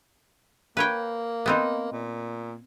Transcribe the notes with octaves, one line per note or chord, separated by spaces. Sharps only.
A#3 B4 C#5 G5
B3 C4 D#4
A#2